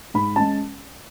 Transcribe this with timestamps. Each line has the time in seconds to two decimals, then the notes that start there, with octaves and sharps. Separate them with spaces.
0.14 G#2 B5
0.36 G#3 C#4 A5